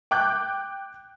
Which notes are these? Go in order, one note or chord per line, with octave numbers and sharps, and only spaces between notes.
G5 D6 F#6 G6